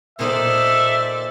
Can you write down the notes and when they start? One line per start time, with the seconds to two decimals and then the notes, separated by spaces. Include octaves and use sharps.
0.19 A#2 D#3 A4 C5 D5 E5